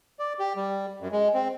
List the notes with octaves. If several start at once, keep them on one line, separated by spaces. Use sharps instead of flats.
D5
G4
G3
F#2
G#3
C4